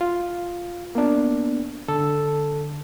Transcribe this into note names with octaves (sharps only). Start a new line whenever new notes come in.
F4
A#3 B3 D4
D3 A4